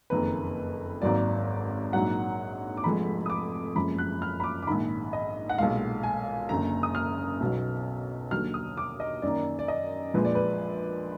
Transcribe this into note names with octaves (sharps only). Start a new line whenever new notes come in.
F#1 F2 D#3 A#3 B4
G#1 G#2 F#3 A#3 D5
A#1 G#2 F#3 A#3 F#5
D6
F1 F2 F3 G#3 B5
D#6
D6
F#1 F#2 F3 G#3 B5
F#6
F6
B5
D6
D6
A#1 G#2 D#3 B5
D#5
F#5
B1 A#2 G#3 F5
G#5
F#1 F#2 D3 A#5
D#6
F6
B1 B2 F#3
D#2 D3 F#3 F6
D#6
D6
D#5
F#2 D#3 A#3 D5
D5
D#5
A#1 A#2 F3 G#3 B4
D5
B4